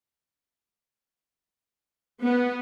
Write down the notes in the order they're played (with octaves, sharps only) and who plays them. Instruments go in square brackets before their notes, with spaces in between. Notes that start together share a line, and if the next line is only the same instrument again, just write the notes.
[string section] B3